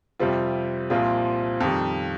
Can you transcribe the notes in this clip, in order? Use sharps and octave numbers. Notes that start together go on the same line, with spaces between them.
F2 C3 G3 C4 F4
C2 A#2 F3 C4 F4
F2 D#3 G3